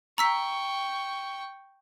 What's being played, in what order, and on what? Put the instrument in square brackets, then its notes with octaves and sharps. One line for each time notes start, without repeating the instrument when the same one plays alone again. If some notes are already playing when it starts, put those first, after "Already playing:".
[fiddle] G5 C#6 [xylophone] A#5 E6 B6